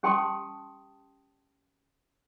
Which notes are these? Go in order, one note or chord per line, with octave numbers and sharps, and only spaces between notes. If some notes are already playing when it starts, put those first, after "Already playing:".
C#4 G4 G5 A5 C6 D#6